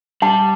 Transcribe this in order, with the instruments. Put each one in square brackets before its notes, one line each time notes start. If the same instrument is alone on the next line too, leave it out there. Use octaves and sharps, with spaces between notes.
[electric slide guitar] G3 [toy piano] F#5 A5